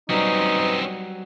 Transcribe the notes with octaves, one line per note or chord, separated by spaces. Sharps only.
F#3 G3 C4 C#4 D#4 B4